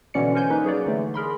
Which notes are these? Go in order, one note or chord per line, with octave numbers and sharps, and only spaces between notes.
B2 D3 E3 C#4 D5 C#7
A#4 C5 G#5 G6
A#3 C#4 D#4 B4
F#3 G#4 C#5 D5
D3 E3 A3
G#4 A#4 B5 C6